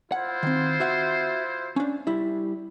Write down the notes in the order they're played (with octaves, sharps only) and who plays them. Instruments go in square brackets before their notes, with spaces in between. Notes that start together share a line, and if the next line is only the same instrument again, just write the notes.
[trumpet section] E4 F4 C5 [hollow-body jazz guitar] F#5
[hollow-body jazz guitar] D#3 C4
F#4 E5 F#5
C#4 D4
G3 E4